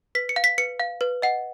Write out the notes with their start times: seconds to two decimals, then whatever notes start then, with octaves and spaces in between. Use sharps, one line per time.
0.15 B4 B6
0.29 C#7
0.36 F5
0.44 B6
0.58 B4 C#7
0.80 F5
1.01 B4
1.22 D#5 F#5